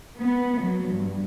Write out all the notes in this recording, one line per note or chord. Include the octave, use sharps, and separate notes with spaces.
B3
F#3
G2